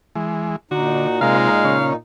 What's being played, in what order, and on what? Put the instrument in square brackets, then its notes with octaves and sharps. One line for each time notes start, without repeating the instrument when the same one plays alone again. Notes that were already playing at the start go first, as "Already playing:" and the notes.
[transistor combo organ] E3 G#3
[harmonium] A#2 D#4 [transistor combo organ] D3 [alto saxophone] F#4
[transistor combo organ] C3 F4 A#4 [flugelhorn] G#3 [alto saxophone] F5
[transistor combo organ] C#3 C#4